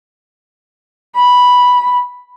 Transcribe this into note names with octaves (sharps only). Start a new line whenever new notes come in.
B5